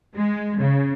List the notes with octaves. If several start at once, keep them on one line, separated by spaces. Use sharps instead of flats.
G#3
C#3